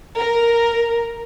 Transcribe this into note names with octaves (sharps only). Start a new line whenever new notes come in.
A#4